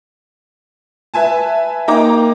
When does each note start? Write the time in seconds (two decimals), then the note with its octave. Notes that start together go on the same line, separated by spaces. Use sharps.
1.14 B4 E5 G#5 A5
1.88 A#3 D#4 G5 A#5 D6